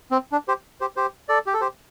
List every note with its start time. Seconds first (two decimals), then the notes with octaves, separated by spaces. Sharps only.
0.11 C4
0.32 D4
0.48 G4 C5
0.81 G4 C5
0.96 G4 C5
1.29 A4 D5
1.46 G4
1.54 A4
1.61 G4 C5